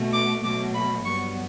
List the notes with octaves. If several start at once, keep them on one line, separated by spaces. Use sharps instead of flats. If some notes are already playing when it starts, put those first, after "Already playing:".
Already playing: B2 A3
D6
B2 F#3 A3 D6
B5
G2 F#3 B3 C#6